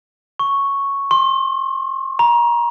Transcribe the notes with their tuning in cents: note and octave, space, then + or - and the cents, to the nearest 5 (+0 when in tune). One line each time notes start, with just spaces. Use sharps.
C#6 +0
C6 +30
A#5 +30